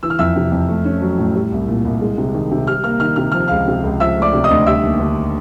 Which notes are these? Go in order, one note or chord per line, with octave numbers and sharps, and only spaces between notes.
E3 E6
F6
F2 E5 E6
C3
F2
A3
C#4
F#3
A2
G3
C2
A#2
C2
G#3
C3
D#3
C3
G3 F6
A#3 F6
D#3 F6
C3 F6
F3 F6
C#2 F5 F6
C3
C#2
F3 E5 E6
A3
D5 D6
C3
D#5 D#6
D2
G3 E5 E6
D#2
D3